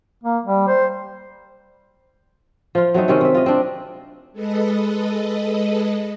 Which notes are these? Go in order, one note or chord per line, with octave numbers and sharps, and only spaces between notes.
A#3
G3
C5
F3 F4
F#3 A3 C4 D#4
C3 D#3 C4 C#4
C3 E5
F4 D#5
C4 D4
G#3 A4 B4 D#5